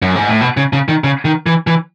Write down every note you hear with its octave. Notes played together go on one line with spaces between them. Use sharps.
F#2
G#2
A2
B2
C#3
C#3
D#3
C#3
D#3
E3
E3